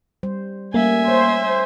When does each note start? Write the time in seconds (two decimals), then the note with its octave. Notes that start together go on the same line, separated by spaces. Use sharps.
0.23 G3 C5
0.74 G3 A3 A#3 C#4 E5 G#5
1.08 C5 C#5